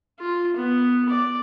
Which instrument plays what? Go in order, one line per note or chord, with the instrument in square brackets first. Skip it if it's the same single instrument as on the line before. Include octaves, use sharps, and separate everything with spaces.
[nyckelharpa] F4
B3
D5